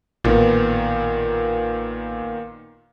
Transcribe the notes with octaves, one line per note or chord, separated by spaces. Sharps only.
A1 A#2 D#3 B3